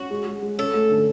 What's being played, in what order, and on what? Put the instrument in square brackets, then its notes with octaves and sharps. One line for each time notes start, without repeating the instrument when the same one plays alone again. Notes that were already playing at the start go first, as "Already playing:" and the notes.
Already playing: [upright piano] C#4 [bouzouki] F#4
[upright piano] G#3
G#3
G#3
[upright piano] C#4 [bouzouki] A4
[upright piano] A3
D3